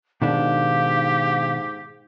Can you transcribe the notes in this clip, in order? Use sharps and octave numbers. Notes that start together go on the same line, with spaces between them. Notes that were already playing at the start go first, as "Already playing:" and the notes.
G#2 B2 D#3 D4 G4 F5